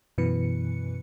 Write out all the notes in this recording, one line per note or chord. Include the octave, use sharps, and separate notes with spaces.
F#2 B2 E3 B4 C#7